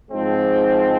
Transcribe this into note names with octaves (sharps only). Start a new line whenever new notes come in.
G#2 F3 G#3 C4